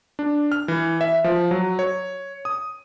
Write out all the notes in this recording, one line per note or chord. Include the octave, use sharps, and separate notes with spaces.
D4
F6
E3
E5
F3
F#3
C#5
D#6